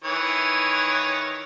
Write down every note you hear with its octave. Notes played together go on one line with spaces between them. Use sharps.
D#3 E3 C#5